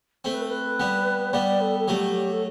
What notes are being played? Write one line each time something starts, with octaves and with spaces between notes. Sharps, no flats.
A3 C4 C5
B4
A4
B4
G3 B3
G3 B3 D5
A4
A4
F#3 A3 G4
A4